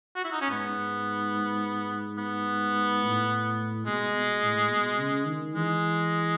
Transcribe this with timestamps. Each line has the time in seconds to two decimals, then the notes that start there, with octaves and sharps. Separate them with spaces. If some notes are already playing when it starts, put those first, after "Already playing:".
0.16 F#4
0.24 E4
0.32 D#4
0.41 C#4
0.49 G#2 B3
2.18 B3
3.03 A2
3.86 B2 G#3
4.14 B2
4.42 A2
4.70 B2
4.99 C#3
5.26 D#3
5.55 E3 G#3